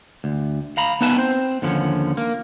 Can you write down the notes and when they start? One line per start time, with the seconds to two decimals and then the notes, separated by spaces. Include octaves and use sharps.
0.24 D2
0.77 F5 A#5 B5
1.01 B3 D#4 E4 B4 G#5 A5
1.16 C4 C5
1.62 D#2 D3 F3 C#4
2.17 A#3